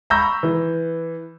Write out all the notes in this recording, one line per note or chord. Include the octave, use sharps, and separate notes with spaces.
A#5 B5 C#6 E6 G6 A#6
E3